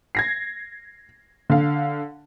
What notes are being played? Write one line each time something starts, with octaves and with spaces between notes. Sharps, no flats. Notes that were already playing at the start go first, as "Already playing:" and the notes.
G#6 A#6 C7
D3 F5